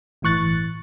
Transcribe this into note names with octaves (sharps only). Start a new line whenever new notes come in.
G1 A2 E3 C#6 F#6 A6